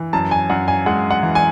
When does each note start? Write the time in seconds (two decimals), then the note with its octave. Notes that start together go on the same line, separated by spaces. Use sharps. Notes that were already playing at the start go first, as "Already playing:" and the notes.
Already playing: E3
0.13 F#2 A5
0.31 G#5
0.50 F#2 F#5
0.68 G#5
0.86 G#3 F#5
1.11 F#5
1.23 E3
1.35 G#5